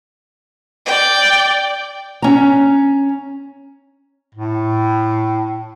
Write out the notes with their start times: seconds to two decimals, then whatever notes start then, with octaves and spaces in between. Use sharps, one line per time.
0.86 D5 G5
2.22 C#4 A#5
4.35 A2